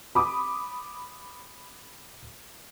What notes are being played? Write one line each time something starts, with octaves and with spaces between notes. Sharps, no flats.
B5 D6 D#6